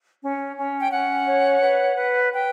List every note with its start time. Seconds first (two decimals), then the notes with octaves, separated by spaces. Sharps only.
0.22 C#4
0.57 C#4
0.79 G5
0.91 C#4 F#5
1.26 C#5
1.61 B4
1.96 B4
2.31 B4 G5